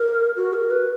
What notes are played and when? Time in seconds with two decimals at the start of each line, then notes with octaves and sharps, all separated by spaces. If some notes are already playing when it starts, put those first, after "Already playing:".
Already playing: A#4
0.36 F#4
0.53 A#4
0.71 B4